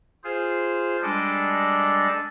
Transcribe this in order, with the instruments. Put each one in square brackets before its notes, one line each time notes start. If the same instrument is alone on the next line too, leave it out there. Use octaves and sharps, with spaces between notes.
[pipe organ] F4 G#4 C5
G3 G#3 D4 A4 D5 D#5